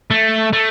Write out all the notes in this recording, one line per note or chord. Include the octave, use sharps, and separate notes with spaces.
A3
A3